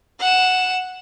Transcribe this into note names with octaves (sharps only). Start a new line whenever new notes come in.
F#5 E7